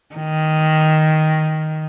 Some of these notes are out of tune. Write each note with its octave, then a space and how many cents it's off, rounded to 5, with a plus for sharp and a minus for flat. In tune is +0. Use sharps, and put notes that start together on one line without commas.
D#3 +5